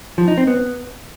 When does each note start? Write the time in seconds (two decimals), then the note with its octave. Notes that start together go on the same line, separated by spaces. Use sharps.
0.18 F3
0.28 D#4
0.38 C4
0.47 B3